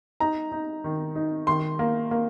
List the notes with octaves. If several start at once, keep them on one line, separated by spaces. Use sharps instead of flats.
D#4 A#5
D#4
D#3
D#4
D#3 C6
A#3
A#3